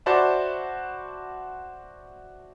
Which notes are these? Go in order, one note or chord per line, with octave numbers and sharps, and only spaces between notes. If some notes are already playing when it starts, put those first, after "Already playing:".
F#4 C5 D5 E5 A5 B5